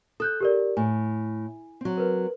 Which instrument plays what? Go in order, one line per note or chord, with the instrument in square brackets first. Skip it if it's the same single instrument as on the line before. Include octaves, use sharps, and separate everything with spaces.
[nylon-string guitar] A4 [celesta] D#6 F#6 G6
[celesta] G4 A#4 D5
[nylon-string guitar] A2 [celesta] G#5
[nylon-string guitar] F#3 C4
[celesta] A#4 B4